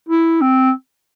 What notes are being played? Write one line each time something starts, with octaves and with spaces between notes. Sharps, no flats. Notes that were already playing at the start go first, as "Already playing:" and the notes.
E4
C4